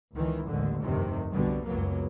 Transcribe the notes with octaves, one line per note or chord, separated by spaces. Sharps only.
C#2 D#3 E3
A1 D#2 G#2 D3
F1 D2 G2 C3 D#3
B1 B2 D3 G3
F#1 C#2 F#3 A#3 B3